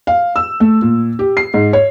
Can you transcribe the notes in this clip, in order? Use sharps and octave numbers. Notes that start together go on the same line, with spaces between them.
F5
E6
A3
A#2
G4
C7
G#2
C#5